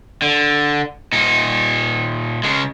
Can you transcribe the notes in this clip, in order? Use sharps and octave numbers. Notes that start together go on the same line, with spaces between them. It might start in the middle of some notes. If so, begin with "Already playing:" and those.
D3
A#2 D#4
C#3 G#3